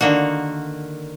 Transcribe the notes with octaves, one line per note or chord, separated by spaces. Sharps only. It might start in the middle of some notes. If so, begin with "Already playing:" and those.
D3 D#3 A#3 F#4